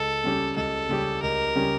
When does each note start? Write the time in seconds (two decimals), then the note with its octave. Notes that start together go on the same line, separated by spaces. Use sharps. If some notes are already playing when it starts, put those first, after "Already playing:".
Already playing: C#2 A4
0.24 C#3 G3 C#4 G4
0.56 C#2 A4
0.89 C#3 G3 C#4 G4
1.23 C#2 A#4
1.56 C#3 G3 C#4 G4